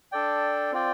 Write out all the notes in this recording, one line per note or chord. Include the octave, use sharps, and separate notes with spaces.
D4 A4 D5 G5
C4 F4 D5 G5